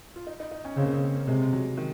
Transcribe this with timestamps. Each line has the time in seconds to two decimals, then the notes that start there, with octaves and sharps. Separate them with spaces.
0.16 F4
0.27 D#4
0.40 D#4
0.51 D#4
0.65 C#4
0.76 C#3 C4
0.84 A#3
0.93 C4
1.02 A#3
1.15 A#3
1.27 C3 G#3
1.53 F#3
1.77 D#3